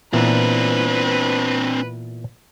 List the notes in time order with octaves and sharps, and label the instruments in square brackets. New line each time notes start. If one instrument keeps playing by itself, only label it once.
[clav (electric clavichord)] A#2 E3 B3 [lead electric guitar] C4 D4 [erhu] B4